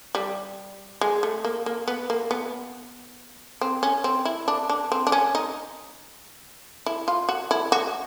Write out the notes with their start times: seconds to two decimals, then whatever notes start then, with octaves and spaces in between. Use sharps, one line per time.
0.15 G3
1.01 G#3
1.23 A3
1.45 A#3
1.66 A#3
1.88 B3
2.10 A#3
2.31 B3
3.61 C4
3.83 C#4
4.04 C4
4.25 E4
4.48 D4
4.69 D4
4.92 C4
5.07 D4
5.12 C#4
5.35 D#4
6.86 E4
7.08 F4
7.29 F#4
7.51 E4
7.72 F#4